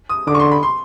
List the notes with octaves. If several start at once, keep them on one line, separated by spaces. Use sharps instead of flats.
D#6
D3 D6
C#6
C6
B5
C6